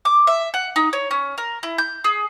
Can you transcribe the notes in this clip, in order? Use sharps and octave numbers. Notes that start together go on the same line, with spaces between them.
D6
E5
F#5
D#4
C#5
C#4
A#4
E4
G6
G#4